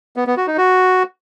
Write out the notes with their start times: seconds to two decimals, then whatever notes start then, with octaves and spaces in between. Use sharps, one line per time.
0.16 B3
0.27 B3
0.37 F#4
0.47 D#4
0.58 F#4